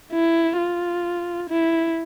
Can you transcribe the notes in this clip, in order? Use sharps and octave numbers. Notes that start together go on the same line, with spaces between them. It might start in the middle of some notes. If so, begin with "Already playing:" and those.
E4
F4
E4